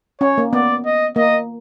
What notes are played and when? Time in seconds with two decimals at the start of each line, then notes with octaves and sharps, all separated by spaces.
0.21 C#4 C#5
0.38 A#3
0.53 B3 D5
0.85 D#5
1.16 A#3 D#5